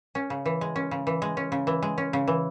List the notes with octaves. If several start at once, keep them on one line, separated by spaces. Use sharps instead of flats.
C#4
C#3
E3
G#3
C#4
C#3
E3
G#3
C#4
C#3
E3
G#3
C#4
C#3
E3